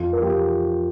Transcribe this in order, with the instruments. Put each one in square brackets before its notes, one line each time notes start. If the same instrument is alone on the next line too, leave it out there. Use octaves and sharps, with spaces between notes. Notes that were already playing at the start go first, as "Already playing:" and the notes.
Already playing: [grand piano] F2 F4
A#4
F3 G4